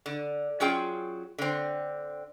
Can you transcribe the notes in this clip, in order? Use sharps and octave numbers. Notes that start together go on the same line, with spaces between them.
D3
F#3 C#4 F4 G#4 G5
D3 C4